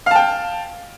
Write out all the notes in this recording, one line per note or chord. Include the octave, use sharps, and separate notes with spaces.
F5 G5 A5